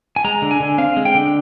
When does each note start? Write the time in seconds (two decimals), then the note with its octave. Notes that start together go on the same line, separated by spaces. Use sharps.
0.16 G#5
0.25 G#3 A#5
0.42 D3
0.51 G#5
0.60 D3
0.78 C4 F5
0.97 G#3
1.05 G5
1.15 D3